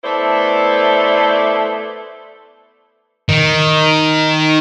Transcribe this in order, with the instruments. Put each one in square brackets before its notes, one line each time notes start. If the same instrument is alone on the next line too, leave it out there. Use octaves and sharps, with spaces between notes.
[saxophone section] A3 B3 E4 A4 C5 D5
[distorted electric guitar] D#3